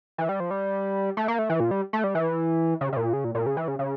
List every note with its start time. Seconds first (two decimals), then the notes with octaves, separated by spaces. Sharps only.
0.18 E3
0.29 G3
0.40 F3
0.51 G3
1.17 A3
1.28 A#3
1.39 A3
1.50 E3
1.60 A#2
1.71 G3
1.93 A3
2.04 G3
2.15 E3
2.81 C#3
2.93 C#3
2.97 A#2
3.13 C#3
3.24 A#2
3.35 A#2
3.46 C#3
3.57 E3
3.68 C#3
3.79 C#3